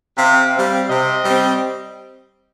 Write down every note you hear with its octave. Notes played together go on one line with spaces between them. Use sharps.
C3 F5
G3 C4
C3 D#5
G3 C4